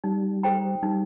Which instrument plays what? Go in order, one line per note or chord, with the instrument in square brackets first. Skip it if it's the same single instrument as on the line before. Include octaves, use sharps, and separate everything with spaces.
[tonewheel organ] G3 [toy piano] D#4
[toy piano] A4 C5 G5 A#5
[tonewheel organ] G3 [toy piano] D#4